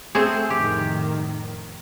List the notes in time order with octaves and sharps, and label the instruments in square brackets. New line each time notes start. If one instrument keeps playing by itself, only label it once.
[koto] A3 C4 G#4
[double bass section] F2 A2 D#3 [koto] G4